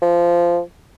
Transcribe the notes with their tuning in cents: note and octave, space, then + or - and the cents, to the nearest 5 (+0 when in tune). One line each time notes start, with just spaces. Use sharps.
F3 -15